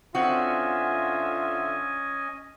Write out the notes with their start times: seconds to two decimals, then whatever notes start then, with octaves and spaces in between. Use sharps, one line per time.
0.15 D3 C4 C#4 F4 F#4 D#5 E5 G#5